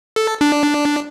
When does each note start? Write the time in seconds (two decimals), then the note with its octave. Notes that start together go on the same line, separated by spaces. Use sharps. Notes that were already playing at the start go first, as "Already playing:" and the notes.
0.16 A4
0.41 D4